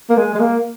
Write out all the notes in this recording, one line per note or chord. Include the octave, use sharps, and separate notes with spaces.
A#3
G#3
G#3
A#3